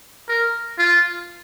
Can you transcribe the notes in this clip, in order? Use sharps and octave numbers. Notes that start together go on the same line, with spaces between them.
A#4
F4